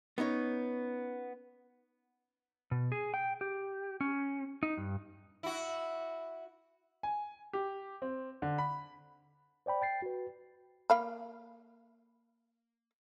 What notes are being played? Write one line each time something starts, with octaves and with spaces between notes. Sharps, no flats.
B3 C#4 D#4 C#5
B2
G#4
G5
G4
C#4
D#4
G2
E4 F#4
G#5
G4
C4
D3
B5
C5 D5 G5 B5
G5 A6 C7
F#4 B4
A#3 F5 B5